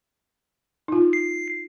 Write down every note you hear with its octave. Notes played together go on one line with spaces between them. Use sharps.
D#4 F4
C7